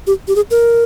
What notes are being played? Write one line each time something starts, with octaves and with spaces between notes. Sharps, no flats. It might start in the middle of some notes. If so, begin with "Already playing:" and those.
G4
G4
G#4
A#4